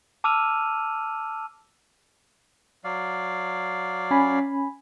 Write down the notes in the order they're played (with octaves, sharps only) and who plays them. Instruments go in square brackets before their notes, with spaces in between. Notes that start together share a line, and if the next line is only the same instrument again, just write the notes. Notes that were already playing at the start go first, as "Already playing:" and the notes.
[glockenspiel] A5 D6 E6 F6 D#7 F7
[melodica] F#3 D5 F5
[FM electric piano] C#4 G#5 B5